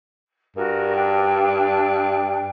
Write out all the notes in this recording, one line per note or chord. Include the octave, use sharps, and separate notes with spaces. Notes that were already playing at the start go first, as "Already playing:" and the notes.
G2 F#4 A#4
D4 G5